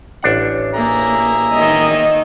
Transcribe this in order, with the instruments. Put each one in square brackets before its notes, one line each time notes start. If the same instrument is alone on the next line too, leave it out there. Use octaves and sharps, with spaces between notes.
[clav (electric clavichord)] A1 D4 F#5
[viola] A#3 [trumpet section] G#4 E5 A#5
[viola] D#3 A#3 [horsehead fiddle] D#5